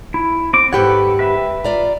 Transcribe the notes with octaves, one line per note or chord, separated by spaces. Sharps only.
E4
C4 D6
G#2 G4 A4 B4 C#5 F#5
B4 E5
F4 D5 A#5